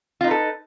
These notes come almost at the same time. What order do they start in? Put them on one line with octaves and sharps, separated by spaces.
F4 D#4 B4 A4